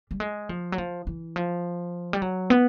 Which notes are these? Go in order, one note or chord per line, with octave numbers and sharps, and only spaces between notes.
G3
G#3
F3
F#3
F3
E3
F3
G3
F#3
B3